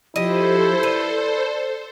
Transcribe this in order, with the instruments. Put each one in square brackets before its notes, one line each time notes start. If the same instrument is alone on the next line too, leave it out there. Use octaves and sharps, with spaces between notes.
[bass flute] F3 [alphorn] E4 [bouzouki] G4 D#5 [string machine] A4 C5
[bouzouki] B4 [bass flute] D5